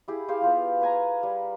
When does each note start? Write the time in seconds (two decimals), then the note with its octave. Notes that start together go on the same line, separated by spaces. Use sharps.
0.08 E4 G4 G#4
0.28 G4 G#4 C5 F5
0.42 B3 F4 G4
0.81 B4 G#5 A#5
1.23 G3